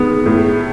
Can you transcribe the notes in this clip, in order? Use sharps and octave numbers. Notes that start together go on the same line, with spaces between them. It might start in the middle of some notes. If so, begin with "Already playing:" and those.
Already playing: D#3 G#3 B3
A2